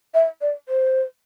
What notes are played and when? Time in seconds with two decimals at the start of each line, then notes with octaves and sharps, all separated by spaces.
0.14 E5
0.41 D5
0.69 C5